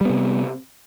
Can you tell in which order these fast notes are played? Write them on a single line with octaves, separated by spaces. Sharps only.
G3 B3 C3